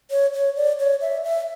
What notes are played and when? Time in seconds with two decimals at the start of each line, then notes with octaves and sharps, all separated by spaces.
0.10 C#5
0.34 C#5
0.56 D5
0.79 C#5
1.01 E5
1.24 E5